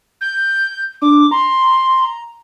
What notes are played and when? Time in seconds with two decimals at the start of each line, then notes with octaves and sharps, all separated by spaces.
0.21 G6
1.02 D4 D6
1.31 A#5 C6